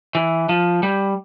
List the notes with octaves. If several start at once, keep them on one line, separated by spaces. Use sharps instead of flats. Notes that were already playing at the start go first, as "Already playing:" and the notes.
E3
F3
G3